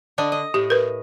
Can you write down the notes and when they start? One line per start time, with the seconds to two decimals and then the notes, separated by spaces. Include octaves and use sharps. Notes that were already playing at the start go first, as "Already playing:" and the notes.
0.18 D3 D4 D#5
0.32 D#5
0.54 A2 G4
0.70 A#4 B4